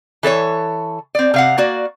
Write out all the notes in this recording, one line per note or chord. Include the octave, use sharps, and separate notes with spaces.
E3 A4 B4 C#5
C4 D5
C3 F5 F#5
A#3 F#4 D5